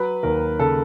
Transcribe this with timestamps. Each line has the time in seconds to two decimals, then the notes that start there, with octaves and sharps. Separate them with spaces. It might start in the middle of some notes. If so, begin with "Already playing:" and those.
Already playing: F#3 B4
0.23 D#2 A#4
0.59 C#3 A4